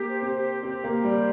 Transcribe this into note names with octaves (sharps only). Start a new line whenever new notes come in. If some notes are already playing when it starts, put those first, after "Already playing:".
Already playing: A#3 G4
C5
C4
G4
C4 G4
A#3
G4
G3
C5